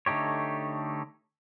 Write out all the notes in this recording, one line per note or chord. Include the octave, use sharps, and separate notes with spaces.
D3 A3 D#4 G4 C#5